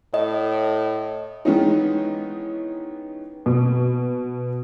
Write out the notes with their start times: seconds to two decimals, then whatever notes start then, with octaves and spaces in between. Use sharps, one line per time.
0.14 A2 D#5
1.45 D#3 E3 G#3 B3 C#4 D#4
3.46 B2